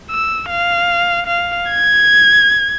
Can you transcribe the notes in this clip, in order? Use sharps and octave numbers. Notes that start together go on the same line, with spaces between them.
E6
F5
F5
G#6